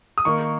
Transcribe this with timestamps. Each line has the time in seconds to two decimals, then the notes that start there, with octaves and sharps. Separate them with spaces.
0.18 D#6
0.25 D#3 A#3 D#4 A#4 C#6